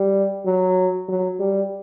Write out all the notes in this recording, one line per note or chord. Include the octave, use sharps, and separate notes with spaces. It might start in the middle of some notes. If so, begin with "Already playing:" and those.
Already playing: G3
F#3
F#3
G3